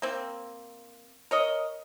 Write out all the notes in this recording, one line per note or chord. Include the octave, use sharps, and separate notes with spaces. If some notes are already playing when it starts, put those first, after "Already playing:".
A#3 C4
A#4 C#5 D#5